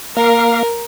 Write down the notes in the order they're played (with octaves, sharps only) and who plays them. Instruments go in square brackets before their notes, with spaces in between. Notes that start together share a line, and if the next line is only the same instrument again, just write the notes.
[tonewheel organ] A#3 F5 [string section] A#4